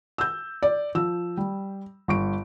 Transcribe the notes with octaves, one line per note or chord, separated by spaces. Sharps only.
E6 G6
D5
F3 E6
G3
G1 C#6 D7